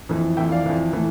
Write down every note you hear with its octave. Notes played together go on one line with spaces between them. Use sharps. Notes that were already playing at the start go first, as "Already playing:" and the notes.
F2 E3
F2 E3 E5 G5
D5 F5
F2 E3
A2 E3